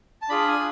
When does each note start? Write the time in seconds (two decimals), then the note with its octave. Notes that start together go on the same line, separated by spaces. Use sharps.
0.22 A5
0.29 D4 F4 G#4 B5
0.48 G#5